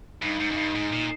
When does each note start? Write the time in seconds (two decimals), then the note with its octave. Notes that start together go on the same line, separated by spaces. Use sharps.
0.22 G2 D#4
0.40 G#2
0.51 F#2
0.57 G2
0.75 G#2
0.93 A#2